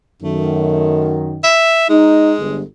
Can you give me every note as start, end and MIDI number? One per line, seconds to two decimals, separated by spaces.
0.23 1.38 42
0.23 1.38 51
0.23 1.18 57
1.44 1.88 76
1.89 2.64 56
1.89 2.32 63
2.38 2.61 31